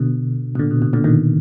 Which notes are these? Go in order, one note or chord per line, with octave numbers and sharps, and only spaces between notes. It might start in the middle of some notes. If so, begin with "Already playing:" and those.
Already playing: B2 D3
B2
A#2 D3
B2
B2
A#2 D3
B2 D#3